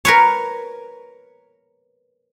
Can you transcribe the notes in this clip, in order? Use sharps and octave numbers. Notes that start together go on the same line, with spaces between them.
A#4 B4 C#5